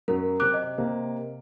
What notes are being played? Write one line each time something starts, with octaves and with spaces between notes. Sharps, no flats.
F#2 F#3 A#4
C3 D6 F#6 D7
D#5
C3 A#3